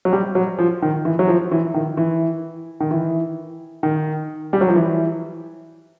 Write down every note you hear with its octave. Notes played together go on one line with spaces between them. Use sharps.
F#3
G3
F#3
F3
D#3
E3
F#3
F3
E3
D#3
E3
D#3
E3
D#3
G3
F#3
F3
E3